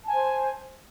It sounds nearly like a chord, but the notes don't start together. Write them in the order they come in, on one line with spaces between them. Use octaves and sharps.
A5 G#5 C5